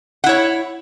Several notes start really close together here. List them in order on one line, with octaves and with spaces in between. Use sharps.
F#5 E4 C#5